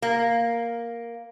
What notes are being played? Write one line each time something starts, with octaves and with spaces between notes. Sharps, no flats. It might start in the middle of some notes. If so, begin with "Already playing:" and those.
A#3